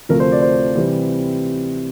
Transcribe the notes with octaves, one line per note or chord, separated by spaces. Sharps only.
D2 C3 F3 A3 A#4
C5
D5
C5
C3 E3 G3 C4